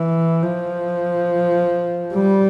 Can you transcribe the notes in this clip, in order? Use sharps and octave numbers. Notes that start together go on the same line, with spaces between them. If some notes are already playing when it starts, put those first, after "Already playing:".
Already playing: E3
F3
G3